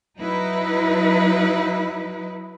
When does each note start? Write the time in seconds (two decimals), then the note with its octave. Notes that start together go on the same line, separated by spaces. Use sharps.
0.18 F#3 D#4 E4 B4